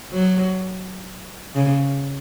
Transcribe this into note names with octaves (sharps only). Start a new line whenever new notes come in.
F#3
C#3